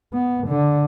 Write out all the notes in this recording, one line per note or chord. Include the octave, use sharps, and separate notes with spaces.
B3
D3